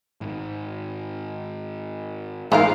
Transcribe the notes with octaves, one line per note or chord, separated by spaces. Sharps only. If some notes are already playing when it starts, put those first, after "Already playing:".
G#1
A1 G#2 E4 F4 A#4 F5